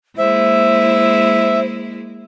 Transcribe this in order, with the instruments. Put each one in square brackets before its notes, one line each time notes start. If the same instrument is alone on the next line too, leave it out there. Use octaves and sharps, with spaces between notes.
[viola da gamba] G#3 A#3 E4 [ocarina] C5 [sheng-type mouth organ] E5